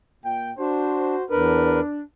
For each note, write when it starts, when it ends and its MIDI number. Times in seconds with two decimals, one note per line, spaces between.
0.24 0.52 46
0.24 0.52 79
0.58 1.15 62
0.58 1.24 66
0.58 1.24 72
1.30 1.80 40
1.30 2.02 62
1.30 1.80 70
1.30 1.80 71